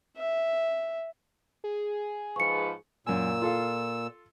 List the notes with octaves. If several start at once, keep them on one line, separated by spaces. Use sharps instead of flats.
E5
G#4
G#2 F3 B4 C#6 C#7
F#2 A#2 G#5 E6
F4 A4 F5